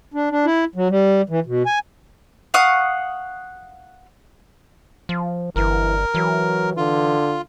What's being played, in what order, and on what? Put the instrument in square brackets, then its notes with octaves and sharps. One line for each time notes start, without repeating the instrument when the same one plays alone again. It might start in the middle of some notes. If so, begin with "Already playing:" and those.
[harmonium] D4
D4
E4
F#3
G3
E3
B2
G#5
[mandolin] F5 F#5 C#6 D#6
[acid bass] F3
[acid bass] G1 [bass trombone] E3 [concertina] A#4
[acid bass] E3 [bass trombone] F#3
[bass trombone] D3 [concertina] F4